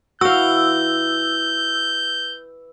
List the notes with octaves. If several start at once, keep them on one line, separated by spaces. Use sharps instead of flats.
E3 E4 F#4 F5 E6 G6